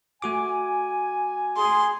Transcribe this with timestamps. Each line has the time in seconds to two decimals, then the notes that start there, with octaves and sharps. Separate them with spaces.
0.22 A3 F#4 G#5 D6
1.57 G#4 C6